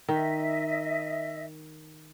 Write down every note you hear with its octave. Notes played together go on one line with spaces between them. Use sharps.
D#3 D#5 E5